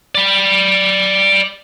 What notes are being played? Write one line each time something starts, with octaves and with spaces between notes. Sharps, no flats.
D5 B5